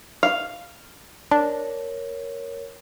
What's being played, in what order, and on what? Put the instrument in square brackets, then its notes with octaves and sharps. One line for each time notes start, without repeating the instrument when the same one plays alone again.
[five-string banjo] F5
[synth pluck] D4 [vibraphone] A#4 C#5